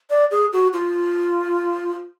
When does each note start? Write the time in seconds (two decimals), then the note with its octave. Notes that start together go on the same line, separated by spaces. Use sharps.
0.10 D5
0.31 G#4
0.53 F#4
0.73 F4